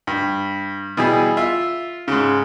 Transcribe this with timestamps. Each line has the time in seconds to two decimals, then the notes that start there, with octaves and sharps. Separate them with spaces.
0.07 G2
0.97 B2 E3 G3 G#4
1.37 F4 E5
2.08 G#2 C#3